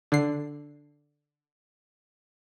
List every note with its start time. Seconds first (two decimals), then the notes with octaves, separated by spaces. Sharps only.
0.12 D3 C7